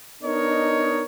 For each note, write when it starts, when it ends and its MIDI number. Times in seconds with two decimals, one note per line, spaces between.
0.23 1.05 59
0.23 1.05 62
0.23 1.05 63
0.23 1.05 70
0.23 1.05 73
0.23 1.05 75